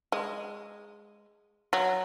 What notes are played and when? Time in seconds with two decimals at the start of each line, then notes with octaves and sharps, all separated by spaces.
0.12 G#3
1.73 F#3